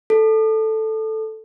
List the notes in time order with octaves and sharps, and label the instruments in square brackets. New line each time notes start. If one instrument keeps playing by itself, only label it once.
[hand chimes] A4